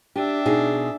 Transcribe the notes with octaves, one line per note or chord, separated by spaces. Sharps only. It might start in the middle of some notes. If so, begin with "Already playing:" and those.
D4 G4 E5
B2 D#4 G#4